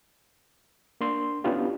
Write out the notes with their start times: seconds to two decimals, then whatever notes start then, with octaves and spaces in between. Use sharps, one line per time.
1.01 A#3 D4 C6
1.44 B3 C#4 D4 E4 F4 G4